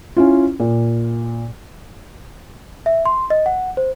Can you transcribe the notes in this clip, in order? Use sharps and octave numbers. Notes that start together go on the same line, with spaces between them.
C#4 E4 F4
A#2
E5
C6
D#5
F#5
C5